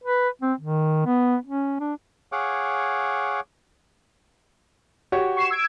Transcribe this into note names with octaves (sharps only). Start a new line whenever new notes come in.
B4
C4
D#3
B3
C#4
D4
G#4 C#5 F5 F#5 D6
F#4 G4 C#5
C#6 C7 E7
E6 G#6 D7